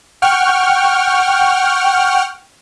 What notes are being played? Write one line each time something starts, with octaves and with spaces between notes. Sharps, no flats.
F#5 G5 C#6 F6